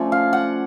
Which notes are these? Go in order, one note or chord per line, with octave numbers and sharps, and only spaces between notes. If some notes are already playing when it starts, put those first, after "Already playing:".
Already playing: F3 A3 C#4 D5
F5
F#5